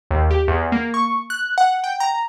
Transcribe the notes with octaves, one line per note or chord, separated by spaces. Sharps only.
D#2
G4
E2
A#3
C#6
F#6
F#5
G5
A#5